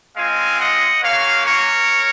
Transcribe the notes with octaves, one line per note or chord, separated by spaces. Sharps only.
G#3 C4 F4 F5 G#5
D#5 F#5
A#3 C#4 F#4 C#5 F5
A#4 C#5